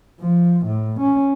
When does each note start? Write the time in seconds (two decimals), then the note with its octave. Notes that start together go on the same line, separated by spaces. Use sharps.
0.21 F3
0.65 A2
1.00 C#4